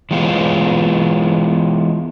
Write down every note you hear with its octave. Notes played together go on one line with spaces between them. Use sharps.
E3 G#3 B3 F4